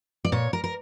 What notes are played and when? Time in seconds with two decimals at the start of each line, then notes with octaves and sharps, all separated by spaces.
0.25 D5
0.32 A#2 C#5
0.53 A#4
0.64 A#4